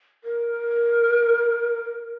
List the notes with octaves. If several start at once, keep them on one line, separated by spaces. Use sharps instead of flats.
A#4